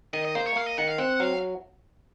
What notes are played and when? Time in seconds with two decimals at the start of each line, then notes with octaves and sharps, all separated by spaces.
0.13 D#3 D#5
0.25 D#5
0.35 A#3 C5
0.46 C#5
0.56 A#3 F5
0.67 D#5
0.78 D#3 F#5
0.88 F5
0.98 C4 F#5
1.20 F#3 F5